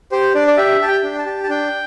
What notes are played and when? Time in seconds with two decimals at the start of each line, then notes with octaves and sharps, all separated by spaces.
0.12 G4 C5
0.35 D4 D5
0.48 D5
0.57 G4 E5
0.81 G4 A5
0.88 G5
1.03 D4
1.18 A5
1.26 G4
1.44 A5
1.49 D4 G5